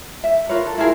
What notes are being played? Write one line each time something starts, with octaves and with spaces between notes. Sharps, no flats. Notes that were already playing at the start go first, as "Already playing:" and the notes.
E5
F4 A#4 B4 C#5
A4
E4 F4 G#4 A#4